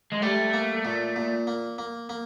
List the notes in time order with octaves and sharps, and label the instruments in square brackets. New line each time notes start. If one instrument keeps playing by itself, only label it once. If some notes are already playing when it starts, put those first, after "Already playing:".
[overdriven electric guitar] G#3
[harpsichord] G3 [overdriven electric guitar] A3
[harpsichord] A#3
A#2
A#2
A#3
A#3
A#3